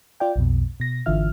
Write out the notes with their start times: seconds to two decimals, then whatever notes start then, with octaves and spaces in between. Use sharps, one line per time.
0.20 F4 D5 G5
0.36 B1 F2 B2
0.80 B2 A#6
1.06 G#1 D3 E3 F4 E5 F6